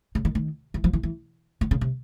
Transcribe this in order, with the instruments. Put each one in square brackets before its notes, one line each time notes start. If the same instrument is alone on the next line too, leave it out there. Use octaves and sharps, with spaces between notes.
[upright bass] C#3
D#3
D#3
E3
F3
E3
E3
D3
C#3
C3